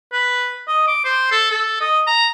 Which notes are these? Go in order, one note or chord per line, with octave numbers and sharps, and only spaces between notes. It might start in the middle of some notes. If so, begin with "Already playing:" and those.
B4
D#5
D6
C5
A4
A4
D#5
A#5